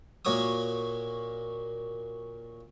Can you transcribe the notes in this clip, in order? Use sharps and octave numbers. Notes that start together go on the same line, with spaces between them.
A#2 A#3 F#4 C#5 D6 D#6